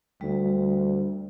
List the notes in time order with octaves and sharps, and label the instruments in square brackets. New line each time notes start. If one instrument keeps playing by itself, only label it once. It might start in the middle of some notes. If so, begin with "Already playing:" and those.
[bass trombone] D2 [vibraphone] G3